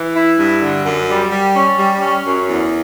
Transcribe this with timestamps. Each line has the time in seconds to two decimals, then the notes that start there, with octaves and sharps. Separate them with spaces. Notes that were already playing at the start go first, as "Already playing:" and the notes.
Already playing: E3
0.15 E4
0.38 G2
0.62 D3
0.85 F#2
1.09 G3
1.32 G3
1.54 C#4
1.79 G3
2.01 C#4
2.25 F#2
2.49 E2